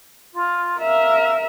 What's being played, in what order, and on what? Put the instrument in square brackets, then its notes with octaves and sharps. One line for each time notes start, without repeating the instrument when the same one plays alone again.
[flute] F4
[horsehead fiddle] A#4 E5 [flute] F5